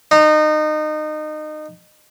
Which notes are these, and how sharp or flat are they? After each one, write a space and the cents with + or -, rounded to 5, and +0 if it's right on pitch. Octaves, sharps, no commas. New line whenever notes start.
D#4 -25